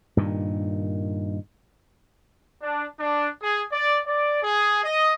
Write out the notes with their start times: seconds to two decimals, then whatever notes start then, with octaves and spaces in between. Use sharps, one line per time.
0.17 G2 A#2 D#3
2.62 D4
3.00 D4
3.43 G#4
3.72 D5
4.07 D5
4.43 G#4
4.84 D#5